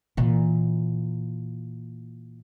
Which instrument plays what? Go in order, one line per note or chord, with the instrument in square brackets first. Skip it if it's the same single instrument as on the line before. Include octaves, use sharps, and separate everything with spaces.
[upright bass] A#2 E3